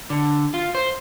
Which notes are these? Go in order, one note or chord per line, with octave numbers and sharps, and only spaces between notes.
D3
F4
C5